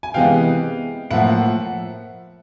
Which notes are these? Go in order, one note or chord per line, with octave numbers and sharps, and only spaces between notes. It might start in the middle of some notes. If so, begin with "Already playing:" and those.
G#5
C3 E3 G#3 B3 F5 G5
A2 F3 A#3 E5 F#5